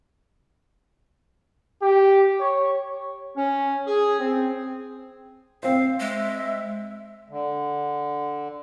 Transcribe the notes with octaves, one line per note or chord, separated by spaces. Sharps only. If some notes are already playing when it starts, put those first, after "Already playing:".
G4
C#5
C#4
G#4
C4
C4 C5 F5
G#3 E5
D3